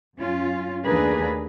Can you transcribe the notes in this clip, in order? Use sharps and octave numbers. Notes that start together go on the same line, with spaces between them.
F#2 C#4 F4
D#2 A3 D4 G#4 A#4 B4